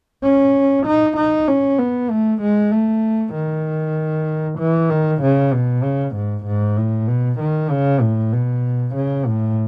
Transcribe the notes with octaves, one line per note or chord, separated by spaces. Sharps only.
C#4
D#4
D#4
C#4
B3
A3
G#3
A3
D#3
E3
D#3
C#3
B2
C#3
G#2
G#2
A2
B2
D#3
C#3
A2
B2
C#3
A2